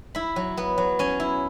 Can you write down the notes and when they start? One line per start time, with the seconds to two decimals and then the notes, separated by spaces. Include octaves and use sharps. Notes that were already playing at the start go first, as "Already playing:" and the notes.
0.15 E4 B5
0.36 F#3
0.57 B3
0.78 F#3
0.99 C#4 G#5
1.20 E4